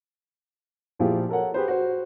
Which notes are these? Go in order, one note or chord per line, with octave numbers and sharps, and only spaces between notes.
A#2 F3 E4 F4 G4 G#4
A4 A#4 C#5 F#5
G4 G#4 B4 C5
F#4 C5